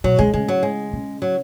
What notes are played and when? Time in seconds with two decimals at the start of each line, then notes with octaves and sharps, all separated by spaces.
0.04 B2 F#3
0.19 C#3 G#3
0.27 D#3
0.34 C#3 G#3
0.48 F#3
0.63 G#3
0.93 C#3
1.22 F#3